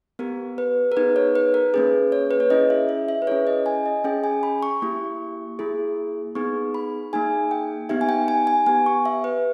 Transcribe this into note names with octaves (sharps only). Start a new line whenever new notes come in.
B3 G4 A#4
B4
A#4
B3 D#4 G#4 B4
C#5
B4
A#4
A#3 C#4 G#4 B4
C#5
B4
C#5
C#4 E4 G#4 D#5
E5
E5
E5
B4
C#4 E4 G#4 C#5
D#5
G#5
D#5
C#4 G#4 G5
G#5
B5
C#6
A#3 E4 G4
A#3 E4 G#4
B3 D#4 G#4 C#6
B5
A#3 D#4 G#4 G#5
G5
B3 D#4 G4 E5
G#5
G5
G#5
G#5
B3 G4 G#5
C#6
E5
B4